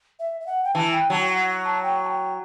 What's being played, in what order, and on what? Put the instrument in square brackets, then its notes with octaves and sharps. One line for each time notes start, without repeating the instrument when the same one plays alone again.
[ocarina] E5
E5
F#5
G5
[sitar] E3 [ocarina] A5
[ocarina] G5
[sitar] F#3 [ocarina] A5
[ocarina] G5
F#5
A5
G5
A5
G5